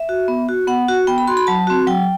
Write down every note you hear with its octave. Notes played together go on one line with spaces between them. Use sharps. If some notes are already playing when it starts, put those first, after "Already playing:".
Already playing: E5
F#4
B3
F#4
B3 F#5
F#4
B3 G5
B5
F#4 C6
B5
F#3 A5
C4 F#4
F#3 G5